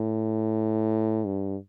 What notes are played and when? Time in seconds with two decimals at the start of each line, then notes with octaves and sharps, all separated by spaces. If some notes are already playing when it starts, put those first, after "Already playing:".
Already playing: A2
1.25 G2